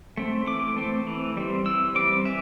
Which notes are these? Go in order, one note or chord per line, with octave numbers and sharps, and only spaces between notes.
A3 C4
E3 D6
A3 C4
E3
G3 C4
E3 E6
G3 C4 D6
E3 E5